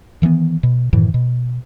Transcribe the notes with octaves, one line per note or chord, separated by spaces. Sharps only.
D#3 E3 G3 B3
B2
F#2 A2 D#3 E3
B2